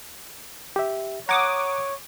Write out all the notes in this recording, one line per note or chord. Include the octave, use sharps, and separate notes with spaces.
G4 E5
C#5 F#5 A#5 D6 D#6 G#6